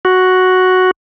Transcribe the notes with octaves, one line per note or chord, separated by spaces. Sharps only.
F#4